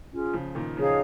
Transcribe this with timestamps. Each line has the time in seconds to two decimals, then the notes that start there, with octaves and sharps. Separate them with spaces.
0.11 C#4 F4 G#4
0.34 C#3 F3
0.55 A#2 D#3
0.77 C#3 F3 D#4 G#4 C#5 F5